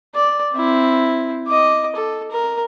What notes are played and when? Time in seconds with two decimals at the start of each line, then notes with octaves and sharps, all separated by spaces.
0.15 D5
0.53 C4 E4
1.47 D#5 D6
1.96 A4
2.31 A#4